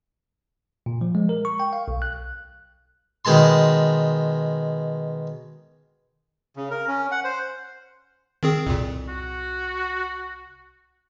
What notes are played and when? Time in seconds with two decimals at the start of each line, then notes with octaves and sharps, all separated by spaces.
0.86 A#2
1.01 F3
1.15 G#3
1.29 A#4
1.45 C#6
1.60 G5
1.73 F5
1.88 B1
2.02 F#6
3.25 B2 D#3 G#3 A5 C6
6.57 C#3
6.70 A#4
6.88 C#4
7.11 F#5
7.24 C5
8.43 D#3 C4 G#4
8.66 C2 F2 A#2
9.08 F#4